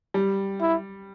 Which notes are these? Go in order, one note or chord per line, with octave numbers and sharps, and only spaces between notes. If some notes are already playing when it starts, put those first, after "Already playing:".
G3
E4